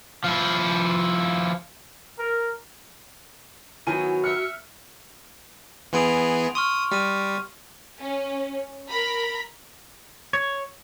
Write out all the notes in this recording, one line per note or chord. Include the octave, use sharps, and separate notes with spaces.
F3 E4
A#4
D#3 F#3 B3 E4 F#4 G#5 D#7
E5 F6 F#6 C#7
E3 B3 G#4 C6 D7 F7
C6 C#6 D#6 F6
G3 F6 D#7
C#4
A#4 A#5 B5
C#5